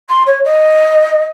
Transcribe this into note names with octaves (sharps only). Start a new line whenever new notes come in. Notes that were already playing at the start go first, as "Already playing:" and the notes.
C6
C#5
D#5